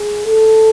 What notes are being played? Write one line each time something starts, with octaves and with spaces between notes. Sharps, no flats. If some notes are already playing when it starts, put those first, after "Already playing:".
Already playing: G#4
A4